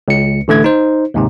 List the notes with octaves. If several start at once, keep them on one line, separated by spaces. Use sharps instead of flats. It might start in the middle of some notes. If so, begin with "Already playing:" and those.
C#2 C#7
A1 D3 A3 G#6
D#4 C5
D#2 G#2 C3